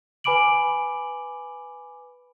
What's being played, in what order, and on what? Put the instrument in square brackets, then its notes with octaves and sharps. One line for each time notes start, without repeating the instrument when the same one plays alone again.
[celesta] B4 G#5 B5 D6 D7 F#7